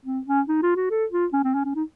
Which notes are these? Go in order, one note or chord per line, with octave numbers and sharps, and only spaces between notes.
C4
C#4
D#4
F4
F#4
A4
F4
C#4
C4
C#4
C#4
D#4